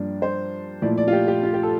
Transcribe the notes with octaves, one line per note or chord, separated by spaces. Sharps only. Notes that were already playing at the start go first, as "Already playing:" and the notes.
Already playing: G2 F3 A#3 D4
C5
A#2 F3 A3 E4 D5
D5
F4
G4
G4
F4
G4
A4